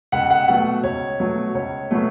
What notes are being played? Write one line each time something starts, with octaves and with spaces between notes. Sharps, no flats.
C#2 F#5
F#5
B2 F#3 A3 F#5
C#2 C#5
B2 F#3 A3
C#2 C#5
B2 F#3 A3